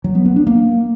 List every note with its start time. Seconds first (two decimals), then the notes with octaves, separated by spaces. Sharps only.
0.04 F#3
0.15 B3
0.25 B3
0.36 D4
0.47 A#3